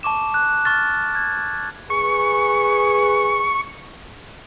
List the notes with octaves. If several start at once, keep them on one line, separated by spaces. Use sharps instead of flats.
A5 C#6 D6 E7
F#6
C#6 F6 A6
G#6
G#4 B4 C#6